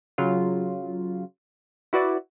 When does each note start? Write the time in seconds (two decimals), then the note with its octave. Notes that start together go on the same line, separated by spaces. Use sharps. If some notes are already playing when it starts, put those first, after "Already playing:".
0.18 C#3 F#3 F4
1.93 E4 F#4 B4 D5